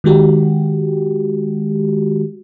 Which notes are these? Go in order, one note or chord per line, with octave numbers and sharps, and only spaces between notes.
D#3 G#3 F#4 G4